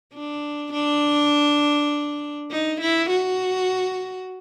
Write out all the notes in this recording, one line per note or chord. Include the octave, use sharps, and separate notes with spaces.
D4
D4
D#4
E4
F#4